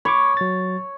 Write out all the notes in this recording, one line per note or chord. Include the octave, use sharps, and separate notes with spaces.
C#5 B5 C#6 D6
F#3 A6